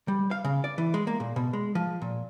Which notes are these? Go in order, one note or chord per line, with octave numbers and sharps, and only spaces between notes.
G3
F5
C#3
D5
E3
G#3
A#3
A#2
B2
G#3
F3
A#2